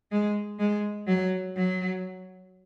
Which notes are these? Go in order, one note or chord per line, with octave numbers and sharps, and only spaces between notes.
G#3
G#3
F#3
F#3